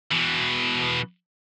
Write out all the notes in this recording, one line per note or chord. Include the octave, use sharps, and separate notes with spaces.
B2 E3